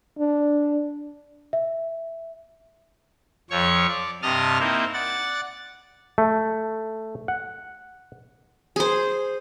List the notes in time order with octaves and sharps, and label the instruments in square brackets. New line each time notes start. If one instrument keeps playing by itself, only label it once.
[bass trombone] D4
[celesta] E5
[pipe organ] F2 F3 C#5 C#6
D5
G2 C3 D#5 A5 D#6 F6
A#3 C4 D#4 E4
D5 F#5 A6
[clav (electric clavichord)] A3
F#5
[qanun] G#4 C5